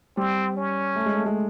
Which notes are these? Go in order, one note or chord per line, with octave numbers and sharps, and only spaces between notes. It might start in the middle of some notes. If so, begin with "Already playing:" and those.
G3 C4
C#4
A3
G#3
A3
G#3